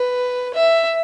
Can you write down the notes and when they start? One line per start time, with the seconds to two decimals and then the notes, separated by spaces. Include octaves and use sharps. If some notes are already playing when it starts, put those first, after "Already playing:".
Already playing: B4
0.54 E5